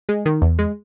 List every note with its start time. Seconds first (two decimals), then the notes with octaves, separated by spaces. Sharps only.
0.09 G#3
0.26 D#3
0.42 E2
0.59 G#3